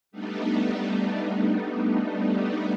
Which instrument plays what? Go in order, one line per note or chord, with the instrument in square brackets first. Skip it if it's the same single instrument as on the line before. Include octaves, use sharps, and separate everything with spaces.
[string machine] G3 A3 B3 D4 D#4